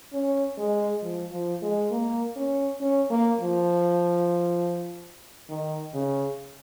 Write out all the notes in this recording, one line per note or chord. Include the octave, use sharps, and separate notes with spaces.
C#4
G#3
F3
F3
G#3
A#3
C#4
C#4
A#3
F3
D#3
C#3